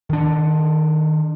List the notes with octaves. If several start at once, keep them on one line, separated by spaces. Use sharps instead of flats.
D#3 D4